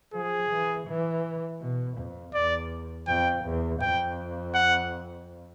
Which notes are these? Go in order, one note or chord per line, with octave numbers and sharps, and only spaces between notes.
F3 G#4
E3
E3
B2
F2
E2 D5
F2 G5
E2
F2 G5
F#5